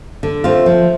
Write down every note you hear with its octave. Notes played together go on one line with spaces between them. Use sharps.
D3
A3 C4 F4
F3